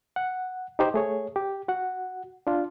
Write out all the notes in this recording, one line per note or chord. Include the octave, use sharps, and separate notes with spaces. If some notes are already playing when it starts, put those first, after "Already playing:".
F#5
D#4 G4 C5
A3 G#4 C#5
G4
F#4 F#5
D4 F4